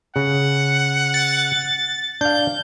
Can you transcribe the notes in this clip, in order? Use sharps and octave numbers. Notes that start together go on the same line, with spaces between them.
C#3 F#5
A6
D4 F5 G6